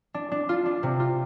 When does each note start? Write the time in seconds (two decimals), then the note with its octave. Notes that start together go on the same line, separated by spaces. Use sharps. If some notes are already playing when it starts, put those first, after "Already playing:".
0.14 D4
0.32 D4
0.49 F4
0.66 D4
0.83 C3
1.00 F4